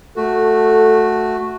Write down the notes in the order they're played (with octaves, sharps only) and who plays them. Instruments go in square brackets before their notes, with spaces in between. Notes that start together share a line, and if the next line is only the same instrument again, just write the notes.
[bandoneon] A3 F#4 [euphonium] A4